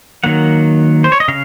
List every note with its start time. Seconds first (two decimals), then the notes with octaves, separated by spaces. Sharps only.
0.24 D#3 F#3 A#3 F#5
1.04 C5
1.12 C#5
1.20 D#5
1.28 C#3 F5